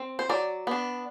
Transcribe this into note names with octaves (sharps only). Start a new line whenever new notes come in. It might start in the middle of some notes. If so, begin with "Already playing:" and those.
Already playing: C4
C5
F#3 D5
B3 D4